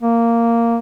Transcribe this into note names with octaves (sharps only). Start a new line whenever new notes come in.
A#3